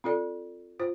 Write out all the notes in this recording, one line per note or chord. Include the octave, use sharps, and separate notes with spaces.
C4 F4 A4 D5
F4 C5